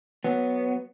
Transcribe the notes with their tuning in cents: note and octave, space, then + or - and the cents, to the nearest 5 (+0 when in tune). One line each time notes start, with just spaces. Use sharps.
F#3 +0 B3 +0